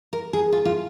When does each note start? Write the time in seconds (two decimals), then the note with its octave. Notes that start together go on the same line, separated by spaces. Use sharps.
0.13 A#4
0.33 G#4
0.52 F4
0.65 F4